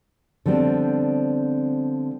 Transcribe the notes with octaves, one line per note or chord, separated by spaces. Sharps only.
D3 F3 G3 B3 C4